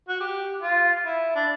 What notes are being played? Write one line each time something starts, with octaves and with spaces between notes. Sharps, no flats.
F#4
G4
F4
E4
D4